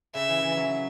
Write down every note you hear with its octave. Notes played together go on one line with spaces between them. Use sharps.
C#3 E5
E3
E3
F#3